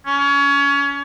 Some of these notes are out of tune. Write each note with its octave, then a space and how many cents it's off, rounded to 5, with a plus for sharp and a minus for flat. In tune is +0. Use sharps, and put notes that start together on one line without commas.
C#4 +25